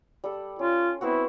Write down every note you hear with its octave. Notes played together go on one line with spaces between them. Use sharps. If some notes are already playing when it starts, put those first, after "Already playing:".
G3 A4
C#4 F4
B3 C4 E4 F#4